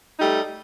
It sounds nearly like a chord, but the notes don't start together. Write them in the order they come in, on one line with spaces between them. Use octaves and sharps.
D#4 G3 A3